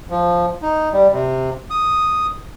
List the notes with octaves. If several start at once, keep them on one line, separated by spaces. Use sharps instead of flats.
F3
D#4
G3
C3
D#6